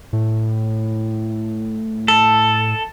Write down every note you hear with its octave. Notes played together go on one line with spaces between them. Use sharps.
A2
A4